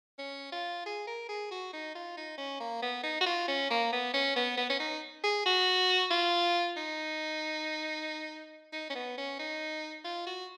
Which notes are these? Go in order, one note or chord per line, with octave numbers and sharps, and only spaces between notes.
C#4
F4
G#4
A#4
G#4
F#4
D#4
F4
D#4
C#4
A#3
B3
D#4
F#4
F4
C#4
A#3
B3
C#4
B3
B3
C#4
D#4
G#4
F#4
F4
D#4
D#4
C#4
B3
C#4
D#4
F4
F#4